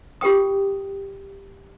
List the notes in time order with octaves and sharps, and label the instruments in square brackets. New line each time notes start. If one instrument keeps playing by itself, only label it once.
[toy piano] F4 G4 A#4 G5 D#6